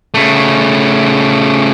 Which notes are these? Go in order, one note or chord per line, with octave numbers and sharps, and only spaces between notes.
C#3 A3